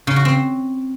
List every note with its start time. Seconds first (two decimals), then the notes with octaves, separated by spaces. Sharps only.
0.07 C#3
0.16 F#4
0.25 C4